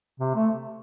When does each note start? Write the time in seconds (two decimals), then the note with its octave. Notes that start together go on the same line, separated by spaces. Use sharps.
0.20 C3
0.35 A3